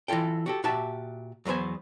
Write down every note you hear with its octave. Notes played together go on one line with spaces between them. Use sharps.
E3 E4 F4 A4 G5
F#4 G4 A4
A#2 F#4 G4 E5 A5
E2 F#3 B3 C5 G#5